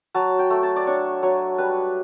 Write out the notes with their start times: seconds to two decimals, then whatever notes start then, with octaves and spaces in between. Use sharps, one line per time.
0.15 F#3 A5
0.39 G5
0.50 A3
0.63 A5
0.76 D5
0.87 D4 C#5
1.23 F#3 C#5
1.58 G3 B4